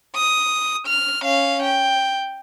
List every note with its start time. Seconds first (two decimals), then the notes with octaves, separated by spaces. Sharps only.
0.16 D#6
0.87 F6
1.24 C#4 F5
1.63 G5